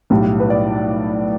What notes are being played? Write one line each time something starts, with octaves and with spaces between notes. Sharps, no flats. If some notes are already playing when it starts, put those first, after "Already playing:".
B1 A2 G3
B4
D5